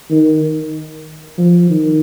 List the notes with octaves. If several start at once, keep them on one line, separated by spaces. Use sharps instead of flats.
D#3
F3
D#3